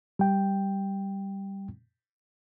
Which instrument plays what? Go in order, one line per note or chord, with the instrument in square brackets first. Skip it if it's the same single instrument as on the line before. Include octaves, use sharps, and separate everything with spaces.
[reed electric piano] G3 G5